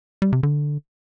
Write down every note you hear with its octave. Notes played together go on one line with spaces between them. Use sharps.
G3
C3
D3